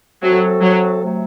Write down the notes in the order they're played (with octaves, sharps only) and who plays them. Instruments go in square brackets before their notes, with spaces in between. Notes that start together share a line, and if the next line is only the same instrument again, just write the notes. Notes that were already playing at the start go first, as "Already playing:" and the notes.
[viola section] F#3 [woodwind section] A3 C4 F#4 A4
[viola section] F#3
[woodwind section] C3 F#3 A3